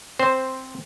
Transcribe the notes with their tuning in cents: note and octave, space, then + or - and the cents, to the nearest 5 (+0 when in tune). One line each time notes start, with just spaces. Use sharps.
C4 +5 C5 +0